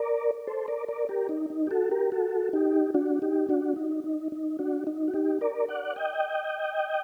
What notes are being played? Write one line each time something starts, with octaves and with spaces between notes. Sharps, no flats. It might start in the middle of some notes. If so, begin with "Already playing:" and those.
Already playing: A#4 D5
A4 C5
A#4 D5
A#4 D5
G4 A#4
D#4
D#4
G4
F#4 A4
G4 A#4
F#4 A4
D#4 G4
D4 F#4
D#4 G4
D4 F#4
D#4
D#4
D#4
D4 F#4
D#4
F#4
D#4 G4
A#4 D5
D5 F#5
D#5 G5